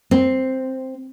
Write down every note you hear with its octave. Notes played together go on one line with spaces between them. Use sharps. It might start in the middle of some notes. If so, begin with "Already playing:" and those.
C4